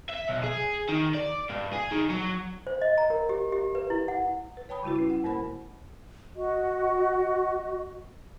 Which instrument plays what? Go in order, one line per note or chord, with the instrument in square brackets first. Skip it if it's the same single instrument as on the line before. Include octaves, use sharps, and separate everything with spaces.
[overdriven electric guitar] E5
B1
G#4
D#3
D5
G2
G#4
D#3
F#3
[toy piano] C5
D#5
A#5
A#4
G4
G4
B4
E4
F#5
[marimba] B4
C#5 G5 A5 B5 D#6
C#3 G3 E4 F#4 B4
C#4 E4
F#5
G#2 A#3 A#4 C5 F#5 B5
[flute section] F#4 D#5